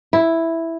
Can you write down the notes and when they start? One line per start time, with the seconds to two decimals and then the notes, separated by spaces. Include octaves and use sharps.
0.13 E4